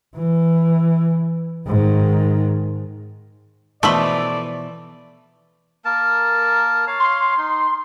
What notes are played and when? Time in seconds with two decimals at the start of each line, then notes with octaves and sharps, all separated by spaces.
0.16 E3
1.67 G#2 D#3
3.83 B2 E3 F3 A3 D5 E5 B5
5.85 A#3 A#4 A5
6.87 C#5 F5
7.00 C6
7.37 D#4